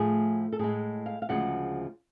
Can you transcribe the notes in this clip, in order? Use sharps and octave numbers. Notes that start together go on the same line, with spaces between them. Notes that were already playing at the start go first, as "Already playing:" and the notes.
Already playing: A2 F3 A3 G#4
A4
A2 G#3 G#4
F5
F5
D2 C#3 F3 G#3 F#5